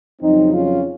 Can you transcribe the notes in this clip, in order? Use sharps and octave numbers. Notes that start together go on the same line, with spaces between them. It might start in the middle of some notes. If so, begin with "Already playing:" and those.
F2 C#3 F#3 C4 D#4
C#4 F4